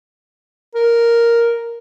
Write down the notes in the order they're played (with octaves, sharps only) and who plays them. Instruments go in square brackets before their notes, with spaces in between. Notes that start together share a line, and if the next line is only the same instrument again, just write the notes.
[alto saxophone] A#4